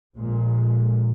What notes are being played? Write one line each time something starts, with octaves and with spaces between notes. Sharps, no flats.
A#1 A#2 G#3